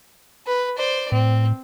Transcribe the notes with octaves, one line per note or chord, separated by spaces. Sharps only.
B4
C5 D5
A2 C4